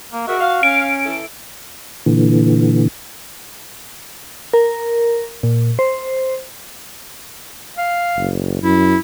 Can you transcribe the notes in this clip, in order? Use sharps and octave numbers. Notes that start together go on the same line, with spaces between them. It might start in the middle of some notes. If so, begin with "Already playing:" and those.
A#3
G#3 F#4 A#4 E5
F5
C#4 D7
E3 E4 A4
A#2 D3 E3
A#4
A#2
C5
F5
F#1
F#2 E4